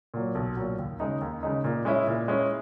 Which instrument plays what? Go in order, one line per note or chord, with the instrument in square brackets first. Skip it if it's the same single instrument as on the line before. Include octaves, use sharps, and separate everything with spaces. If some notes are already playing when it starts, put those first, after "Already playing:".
[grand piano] A#2 F#3
B1
A#2 F#3
D#2
C#3 G#3 D#4
D#2
C#3 G#3 D#4
A#2
G#3 C#4 E4
A#2
G#3 C#4 E4